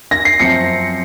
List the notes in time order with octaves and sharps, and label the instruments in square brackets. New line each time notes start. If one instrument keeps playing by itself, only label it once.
[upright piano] A#6
C7
[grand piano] F#2 F3 C4 [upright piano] C#7